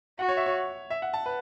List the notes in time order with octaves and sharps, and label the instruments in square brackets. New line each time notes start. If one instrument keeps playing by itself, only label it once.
[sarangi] F#4 [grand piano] F#5
[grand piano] C#5
E5
C#5
E5
F#5
A5
B4